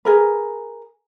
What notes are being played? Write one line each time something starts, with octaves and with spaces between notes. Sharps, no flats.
G#4 A#4 B4